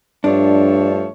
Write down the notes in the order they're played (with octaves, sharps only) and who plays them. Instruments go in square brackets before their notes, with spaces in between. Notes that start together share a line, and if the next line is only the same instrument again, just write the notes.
[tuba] G2 [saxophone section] F3 A3 C#5 [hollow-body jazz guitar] D4